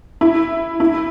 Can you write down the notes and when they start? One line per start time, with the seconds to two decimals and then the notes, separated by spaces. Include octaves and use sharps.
0.21 E4
0.80 E4